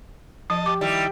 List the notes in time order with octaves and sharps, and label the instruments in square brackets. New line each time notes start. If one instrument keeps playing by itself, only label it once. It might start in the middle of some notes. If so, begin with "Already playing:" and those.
[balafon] F3 [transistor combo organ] D#5 A5
[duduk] G4 [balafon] D6
[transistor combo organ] D#3 E4 [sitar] G3